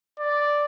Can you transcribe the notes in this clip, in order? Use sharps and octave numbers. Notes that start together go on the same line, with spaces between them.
D5